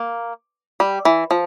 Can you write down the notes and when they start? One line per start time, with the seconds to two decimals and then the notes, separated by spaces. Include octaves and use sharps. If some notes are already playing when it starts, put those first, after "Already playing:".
Already playing: A#3
0.80 G3
1.05 E3
1.31 F3